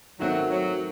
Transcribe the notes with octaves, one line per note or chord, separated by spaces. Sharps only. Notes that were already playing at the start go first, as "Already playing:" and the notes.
D#3 F#3 A3 C4 F#4
F#3